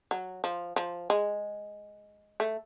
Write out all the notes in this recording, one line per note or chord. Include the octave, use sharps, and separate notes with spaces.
F#3
F3
F3
G#3
A3